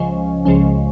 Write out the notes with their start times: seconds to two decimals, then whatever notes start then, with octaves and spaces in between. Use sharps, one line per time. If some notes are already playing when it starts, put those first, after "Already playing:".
Already playing: C#2 C#3 F3 G#3 C#4
0.45 C#2 C#3 F3 G#3 C#4